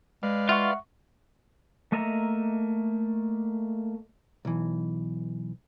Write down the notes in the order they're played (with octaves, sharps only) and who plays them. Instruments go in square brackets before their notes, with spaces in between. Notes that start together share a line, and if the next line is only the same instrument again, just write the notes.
[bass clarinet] G#3 [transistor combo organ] B4 D5 F5
[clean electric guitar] F4 [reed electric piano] E5 F#5 C#6
[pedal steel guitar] A3 A#3 D#5 E5 A#5
[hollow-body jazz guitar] B1 E3